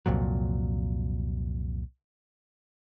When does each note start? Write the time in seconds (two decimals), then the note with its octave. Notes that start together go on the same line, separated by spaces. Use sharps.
0.06 C2 F2 A#2 F#3